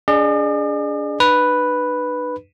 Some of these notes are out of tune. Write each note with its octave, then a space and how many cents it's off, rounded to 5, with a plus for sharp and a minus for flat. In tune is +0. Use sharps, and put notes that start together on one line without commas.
D4 -35 G#4 +0 D5 +45
D4 +45 B4 +0